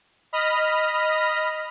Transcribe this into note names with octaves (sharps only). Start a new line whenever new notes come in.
D#5 B5 F6 A#6